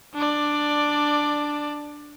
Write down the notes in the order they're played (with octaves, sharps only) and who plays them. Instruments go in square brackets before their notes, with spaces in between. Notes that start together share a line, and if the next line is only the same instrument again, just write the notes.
[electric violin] D4 D5